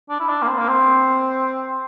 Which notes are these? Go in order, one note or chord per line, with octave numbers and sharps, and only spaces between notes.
D4
E4
D4
A#3
C4
A#3
C4